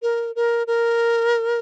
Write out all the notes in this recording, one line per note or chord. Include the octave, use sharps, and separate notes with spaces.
A#4
A#4
A#4